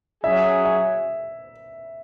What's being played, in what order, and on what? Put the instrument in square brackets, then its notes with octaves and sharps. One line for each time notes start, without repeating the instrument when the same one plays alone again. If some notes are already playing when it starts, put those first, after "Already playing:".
[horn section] F#3 C#4 G#4 [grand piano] E5
[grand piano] E5